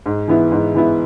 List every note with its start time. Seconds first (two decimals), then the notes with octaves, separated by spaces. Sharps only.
0.06 G#2
0.28 E3 B3 E4
0.52 G#2
0.74 E3 B3 E4